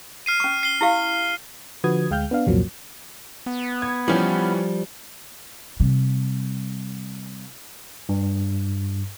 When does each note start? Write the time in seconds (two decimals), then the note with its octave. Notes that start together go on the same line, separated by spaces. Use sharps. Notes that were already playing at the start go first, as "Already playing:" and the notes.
0.26 F6 C7 D#7
0.40 C#4 C#6
0.63 C7 G7
0.81 E4 G4 F5
1.84 D3 F3 F#4 B4 D#6 G#6
2.10 D2 G#3 F5 G5 F6 G6
2.31 B3 D4 F5
2.46 C2 F2 A#2 F3 F#3 A#3
3.46 B3
3.82 G#6
4.08 E3 F3 G3 C#4
5.80 C3 G3
8.09 G2